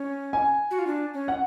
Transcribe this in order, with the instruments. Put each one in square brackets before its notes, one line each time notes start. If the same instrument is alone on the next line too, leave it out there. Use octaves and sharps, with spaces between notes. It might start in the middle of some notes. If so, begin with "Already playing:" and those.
Already playing: [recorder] C#4
[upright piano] G#5
[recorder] F#4
F4
D4
C#4
[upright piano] F#5